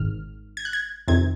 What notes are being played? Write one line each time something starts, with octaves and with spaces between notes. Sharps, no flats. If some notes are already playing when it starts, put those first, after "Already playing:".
Already playing: G#1 G#2 D#3 F6
G#6
F#6
G#6
F2 C3 D#3 G#6